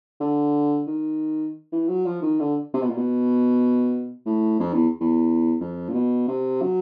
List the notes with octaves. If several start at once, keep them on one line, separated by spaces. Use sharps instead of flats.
D3
D#3
E3
F#3
F3
D#3
D3
C3
B2
A#2
B2
A2
F2
E2
E2
F2
A#2
B2
C3
F#3